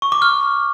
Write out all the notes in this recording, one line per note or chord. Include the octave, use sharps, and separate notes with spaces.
C#6
D6
F6